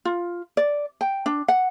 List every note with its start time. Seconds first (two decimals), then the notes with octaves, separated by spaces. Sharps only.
0.05 F4
0.57 D5
1.01 G5
1.26 D4
1.48 F#5